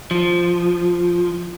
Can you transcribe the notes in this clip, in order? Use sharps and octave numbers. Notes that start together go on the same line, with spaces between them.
F3